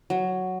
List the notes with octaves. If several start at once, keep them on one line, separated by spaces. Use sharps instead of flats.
F#3